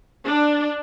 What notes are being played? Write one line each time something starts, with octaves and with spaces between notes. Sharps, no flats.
D4